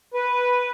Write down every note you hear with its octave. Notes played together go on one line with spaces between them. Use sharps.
B4